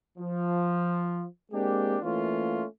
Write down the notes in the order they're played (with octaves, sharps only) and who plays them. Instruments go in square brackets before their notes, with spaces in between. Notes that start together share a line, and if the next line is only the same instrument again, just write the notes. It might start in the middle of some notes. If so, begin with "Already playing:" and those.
[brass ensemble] F3
G#3 A#3 C4 D4 G4
E3 A3 A#3 C#4 F4